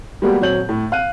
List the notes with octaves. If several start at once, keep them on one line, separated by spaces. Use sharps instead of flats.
G3 G#3 A#3 B3 F#4 G4
D#1 F#3 C4 C#5 G6 F#7
A2
F5 F#6 D#7